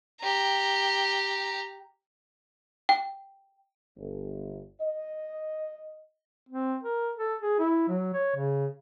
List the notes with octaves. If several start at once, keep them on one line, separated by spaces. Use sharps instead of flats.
G4 A#5
G5
G1
D#5
C4
A#4
A4
G#4
E4
F#3
C#5
C#3